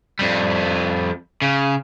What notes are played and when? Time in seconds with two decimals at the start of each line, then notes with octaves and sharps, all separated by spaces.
0.19 F2 G3
1.42 C#3